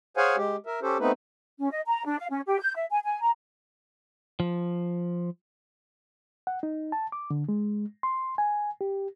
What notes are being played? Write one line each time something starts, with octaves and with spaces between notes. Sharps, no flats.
G#4 C5 C#5 F5 F#5 G#5
G#3 G4
A#4 E5
C#4 G4 A4 C5
A3 B3 C4 D#4 B4
C#4
D#5
A#5
D4
F5
C#4
G4
G6
E5
G#5
G#5
A#5
F3
F#5
D#4
A5
D6
D3
G#3
C6
G#5
G4